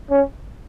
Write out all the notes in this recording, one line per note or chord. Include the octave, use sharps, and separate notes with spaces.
C#4